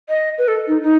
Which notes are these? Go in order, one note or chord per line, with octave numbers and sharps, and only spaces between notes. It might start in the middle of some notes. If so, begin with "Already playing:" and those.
D#5
B4
A4
D#4
D#4